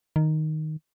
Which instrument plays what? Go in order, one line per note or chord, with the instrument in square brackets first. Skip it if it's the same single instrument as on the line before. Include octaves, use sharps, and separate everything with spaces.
[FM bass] D#3